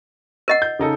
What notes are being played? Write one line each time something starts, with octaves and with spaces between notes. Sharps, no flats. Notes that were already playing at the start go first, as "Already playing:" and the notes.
A#4 D#5 F#5
G6
C#3 D#4 A4